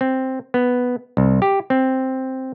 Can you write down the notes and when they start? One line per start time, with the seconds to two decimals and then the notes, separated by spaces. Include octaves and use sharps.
0.01 C4
0.54 B3
1.17 C2
1.42 G4
1.70 C4